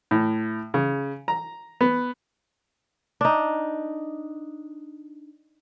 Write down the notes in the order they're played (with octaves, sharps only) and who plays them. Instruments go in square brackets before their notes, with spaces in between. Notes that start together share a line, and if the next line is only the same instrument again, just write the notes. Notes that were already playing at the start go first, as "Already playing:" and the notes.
[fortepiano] A2
C#3
A#5
B3
[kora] D4 D#4